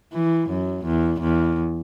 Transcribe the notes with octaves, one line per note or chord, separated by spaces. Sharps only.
E3
F#2
E2
E2